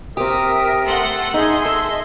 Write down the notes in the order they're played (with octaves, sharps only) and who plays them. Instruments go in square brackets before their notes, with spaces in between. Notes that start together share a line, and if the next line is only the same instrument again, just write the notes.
[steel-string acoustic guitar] C4 G4 [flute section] A#4 E5 [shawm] D#6
[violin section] A3 F#5 C6 [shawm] A4
[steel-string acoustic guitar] D#4 [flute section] G#4 [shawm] E5 [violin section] C6
[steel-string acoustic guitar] A4 [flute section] D#5 [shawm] E5